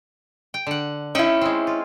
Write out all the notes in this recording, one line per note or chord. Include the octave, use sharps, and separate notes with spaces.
G5
D3 F#5
C#4 D#4 E4 E5 G5
G#3 C4
F4